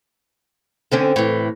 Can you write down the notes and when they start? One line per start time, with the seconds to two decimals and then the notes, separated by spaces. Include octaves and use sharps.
0.92 D3 C4 C#4
1.16 A2 E3